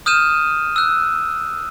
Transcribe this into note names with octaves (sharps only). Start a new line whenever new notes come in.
D#6 F6 G6 D#7 E7
E6 F#6